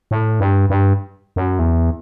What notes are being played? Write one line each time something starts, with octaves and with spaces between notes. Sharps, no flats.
A2
G2
G2
F#2
E2